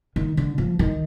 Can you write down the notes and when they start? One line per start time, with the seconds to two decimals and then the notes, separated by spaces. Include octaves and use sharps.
0.16 D#3
0.37 D3
0.58 F3
0.79 D#3